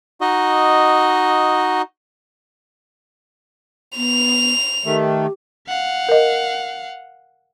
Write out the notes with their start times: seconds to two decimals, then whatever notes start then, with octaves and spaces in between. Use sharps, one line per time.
0.21 D#4 F#4 D#5
3.96 B3 F7
4.85 D#3 A3 G4
5.68 F5 F#5
6.09 A#4 D#5